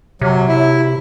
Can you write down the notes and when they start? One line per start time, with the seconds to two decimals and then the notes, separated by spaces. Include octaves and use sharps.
0.21 C3 F#3
0.48 E4